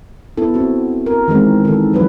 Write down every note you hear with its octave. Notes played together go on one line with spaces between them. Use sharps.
B3 E4 A4
C4 F#4
A#4
D#3 E3 G#3 C4
D#3 A4
F3 F#3 B4